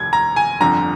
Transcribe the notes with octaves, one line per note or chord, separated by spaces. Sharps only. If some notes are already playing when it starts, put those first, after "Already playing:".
Already playing: F1 D#2 G#6
A#5
G#5
G1 F2 D3 A#5